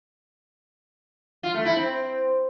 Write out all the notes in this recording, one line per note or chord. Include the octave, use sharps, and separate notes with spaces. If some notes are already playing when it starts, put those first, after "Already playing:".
F4
A3
E4
C4